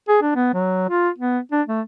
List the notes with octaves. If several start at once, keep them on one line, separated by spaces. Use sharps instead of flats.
G#4
D4
B3
F#3
F4
B3
D4
A3